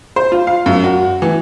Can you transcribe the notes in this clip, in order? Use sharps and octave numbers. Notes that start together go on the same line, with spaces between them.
C5
F4
F5
F#2
F#4
E3